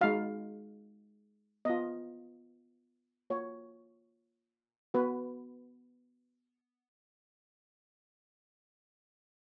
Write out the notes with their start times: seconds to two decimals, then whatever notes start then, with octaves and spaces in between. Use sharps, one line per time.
0.01 G#3 D#4 F#4 F5
1.65 B3 F4 D#5
3.30 A#3 F4 C#5
4.94 B3 F#4 B4